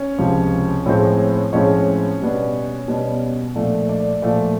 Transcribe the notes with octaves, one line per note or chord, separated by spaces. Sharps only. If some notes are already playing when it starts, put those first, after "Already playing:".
Already playing: C#4 C#5
C#2 C3 F3
A2 F3 G#3 C4
A2 F3 G#3 C4 C#4 C#5
B2 G3 B3 D4
B2 G3 B3 D4
A#2 F3 A3 D4
D4 D5
A#2 F3 A3 D4 D5